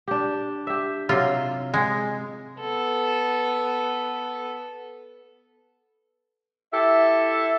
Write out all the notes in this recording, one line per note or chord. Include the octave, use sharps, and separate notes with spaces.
D4 G4
G4 E5
C3 F#3 F4
G#3
B3 A4
E4 G4 A4 E5